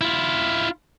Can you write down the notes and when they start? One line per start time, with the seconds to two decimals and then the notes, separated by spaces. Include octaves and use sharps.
0.01 E4 F4